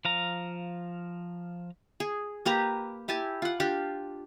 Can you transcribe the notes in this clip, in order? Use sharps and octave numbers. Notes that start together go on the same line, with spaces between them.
F3 F5 A#5
G#4
A#3 G4 B4 A#5
E4 G4 G#5 A5
F4 F#5
D4 F4 G4